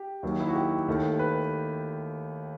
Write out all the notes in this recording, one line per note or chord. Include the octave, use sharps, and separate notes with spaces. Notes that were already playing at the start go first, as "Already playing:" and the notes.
Already playing: G4
D#2 D#3 F#3
D#4
E4
F#4
G4
D#2 D#3 A3
B4